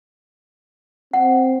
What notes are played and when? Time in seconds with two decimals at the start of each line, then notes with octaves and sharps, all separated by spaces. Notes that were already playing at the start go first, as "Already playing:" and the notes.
1.13 C4 F#5